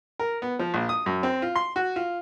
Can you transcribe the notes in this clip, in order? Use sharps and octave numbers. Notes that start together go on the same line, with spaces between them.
A#4
B3
F3
A#1
D#6
F#2
C4
F4
C6
F#4
F4